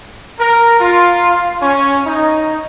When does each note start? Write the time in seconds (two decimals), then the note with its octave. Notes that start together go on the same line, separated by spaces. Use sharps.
0.40 A#4
0.80 F4
1.62 C#4
2.06 D#4